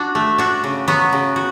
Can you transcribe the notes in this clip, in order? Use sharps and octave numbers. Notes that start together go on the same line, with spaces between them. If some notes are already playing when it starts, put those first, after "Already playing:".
Already playing: D4 F#4
A3
D4 F#4
C#3
F#3 B3 F#4
C#3
F#4